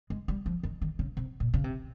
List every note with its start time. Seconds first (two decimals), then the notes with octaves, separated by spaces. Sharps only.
0.10 G#3
0.28 G3
0.46 F3
0.63 D#3
0.82 D#3
0.99 C#3
1.17 C3
1.40 A#2
1.54 C#3
1.64 C3